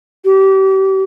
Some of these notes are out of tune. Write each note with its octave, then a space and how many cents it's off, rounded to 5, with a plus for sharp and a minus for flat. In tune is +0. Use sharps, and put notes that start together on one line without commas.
G4 -30